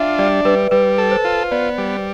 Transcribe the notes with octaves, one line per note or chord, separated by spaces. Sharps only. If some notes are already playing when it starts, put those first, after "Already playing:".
Already playing: D4 F4 E5 G5
G3 D5
G3 B4
G3 B4
A4
C5
F4
B3 D5
G3